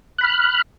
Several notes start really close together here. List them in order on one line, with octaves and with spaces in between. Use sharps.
F#6 B5 F6